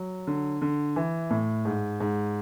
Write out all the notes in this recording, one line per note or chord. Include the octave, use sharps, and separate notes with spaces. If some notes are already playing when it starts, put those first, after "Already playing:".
Already playing: F#3
D3
D3
E3
A2
G#2
G#2